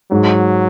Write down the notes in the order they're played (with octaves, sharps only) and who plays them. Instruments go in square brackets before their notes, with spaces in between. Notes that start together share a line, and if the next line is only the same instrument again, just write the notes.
[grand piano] G#2 [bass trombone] F#3